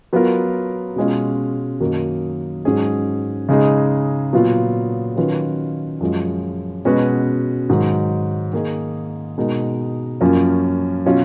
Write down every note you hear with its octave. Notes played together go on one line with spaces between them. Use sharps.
F#3 B3 F4 A#4
B2 G#3 C#4 F4
F#2 D#3 F#3 A#3 D#4
G#2 F#3 C#4 G#4
C#3 G#3 D#4 G#4
A#2 F#3 B3 F4
D#3 F#3 C#4 F4 B4
F#2 F3 G#3
B2 G#3 C#4 F#4 B4
G#2 D#3 F#3
D#3 A#3 D#4 G#4
B2 G#3 D#4 A#4
F#2 F3 A#3 C#4
B2 F#3 C#4 F4